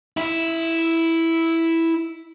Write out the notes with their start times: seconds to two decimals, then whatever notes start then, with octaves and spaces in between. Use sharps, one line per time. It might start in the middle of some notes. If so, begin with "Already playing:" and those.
0.17 E4 E5